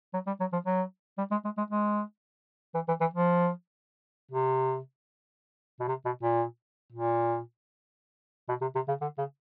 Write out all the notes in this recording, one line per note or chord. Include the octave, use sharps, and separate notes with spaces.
F#3
G3
F#3
F3
F#3
G3
G#3
G#3
G#3
G#3
E3
E3
E3
F3
C3
B2
C3
B2
A#2
A#2
B2
C3
C3
C#3
D3
C#3